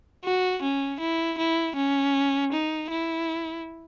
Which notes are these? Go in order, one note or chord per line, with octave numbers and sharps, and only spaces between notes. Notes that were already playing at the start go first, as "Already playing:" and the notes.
F#4
C#4
E4
E4
C#4
D#4
E4